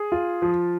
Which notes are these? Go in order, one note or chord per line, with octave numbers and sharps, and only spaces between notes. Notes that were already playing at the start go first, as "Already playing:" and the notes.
Already playing: G#4
F4
F3